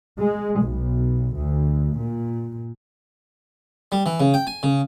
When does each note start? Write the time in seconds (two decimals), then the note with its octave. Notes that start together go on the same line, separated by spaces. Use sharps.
0.18 G#3
0.62 B1
1.36 D2
1.98 A#2
3.92 G3
4.06 E3
4.20 C#3
4.34 G5
4.47 G#5
4.63 C#3